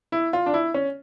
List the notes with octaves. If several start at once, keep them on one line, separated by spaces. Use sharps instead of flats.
E4
F4
D4
E4
C#4